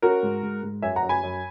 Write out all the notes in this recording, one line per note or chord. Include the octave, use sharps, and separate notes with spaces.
C#4 F#4 A#4
G#2
G#2
G#2
F#2 E5 G#5
F#5 A#5
F#2
G#5 B5
F#2